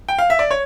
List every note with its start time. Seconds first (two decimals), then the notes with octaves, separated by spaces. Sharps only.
0.08 G5
0.19 F5
0.30 E5
0.39 D5
0.51 C#5